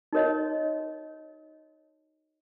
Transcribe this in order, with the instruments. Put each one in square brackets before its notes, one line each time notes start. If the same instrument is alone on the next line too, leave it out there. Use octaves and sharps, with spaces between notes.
[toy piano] D#4 F#4 A#4 C#5 D#5